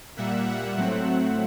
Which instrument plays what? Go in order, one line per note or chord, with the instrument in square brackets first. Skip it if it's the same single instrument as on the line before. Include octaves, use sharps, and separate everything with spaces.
[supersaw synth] A#2 G3 A#3 E5 F#5
E5 F#5
A2 F#3 A3 C4